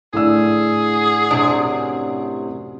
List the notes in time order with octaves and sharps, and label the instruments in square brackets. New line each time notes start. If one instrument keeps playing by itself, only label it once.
[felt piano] A2 D3 E6 [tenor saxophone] G#4
[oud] F#2 C3 D4